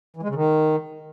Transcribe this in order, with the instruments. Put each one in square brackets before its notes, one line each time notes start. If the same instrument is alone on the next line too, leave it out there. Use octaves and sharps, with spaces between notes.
[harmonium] E3
G#3
C#3
D#3